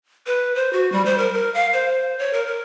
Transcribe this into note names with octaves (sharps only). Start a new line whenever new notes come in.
B4
C5
F#4
G3
C5
A#4
A#4
F5
C5
C#5
A#4
A#4